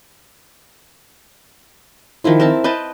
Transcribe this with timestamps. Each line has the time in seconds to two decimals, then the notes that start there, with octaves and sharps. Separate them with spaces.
2.24 D#3 F3 E4 F4
2.40 C4 A#4 E5 A5
2.64 B4 D#5 G5 A5